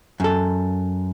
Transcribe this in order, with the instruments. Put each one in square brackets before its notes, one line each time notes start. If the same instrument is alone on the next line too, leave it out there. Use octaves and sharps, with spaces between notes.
[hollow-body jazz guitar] F#2 A4